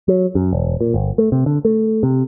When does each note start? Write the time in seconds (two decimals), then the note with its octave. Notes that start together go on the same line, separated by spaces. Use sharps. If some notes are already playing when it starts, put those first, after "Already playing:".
0.08 F#3
0.35 F#2
0.53 E1
0.81 A#2
0.94 G1
1.18 A3
1.32 C3
1.46 D3
1.65 A3
2.03 C3